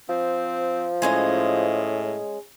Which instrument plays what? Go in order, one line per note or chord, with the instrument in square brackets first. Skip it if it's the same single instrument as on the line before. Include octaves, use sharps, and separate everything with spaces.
[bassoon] F3 [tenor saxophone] C4
[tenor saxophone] A2 [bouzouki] G#3 C#4 D#5